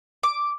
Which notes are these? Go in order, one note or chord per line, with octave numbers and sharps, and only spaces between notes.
D6